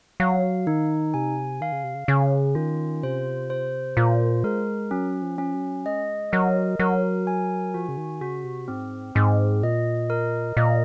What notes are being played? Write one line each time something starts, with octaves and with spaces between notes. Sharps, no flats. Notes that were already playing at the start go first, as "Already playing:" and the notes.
F#3 F5
D#3 D#4
C3 G#5
D#3 F5
C#3
C3
C#3
C#3 C#4
D#3 F4
C3 C5
C5
A#2 F4
G#3 A#4
F#3 C#4
F3
C#4
F#3
G#3 D#5
F#3 A#4
F#3 A#4
G#5
F3 F#4
C#3
D#3
C#3 F#4
C3
G#2 C4
G#2 C4
A#2 D#5
A#4
A#2 D#5